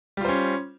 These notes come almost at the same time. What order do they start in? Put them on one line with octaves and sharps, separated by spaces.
G3 F4 C5 C#4